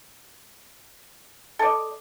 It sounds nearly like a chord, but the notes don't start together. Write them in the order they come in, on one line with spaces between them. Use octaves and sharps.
A4 D5 D#5